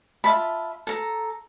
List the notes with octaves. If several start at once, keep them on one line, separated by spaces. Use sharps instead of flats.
F4 E5 A5 B5
A4 A#5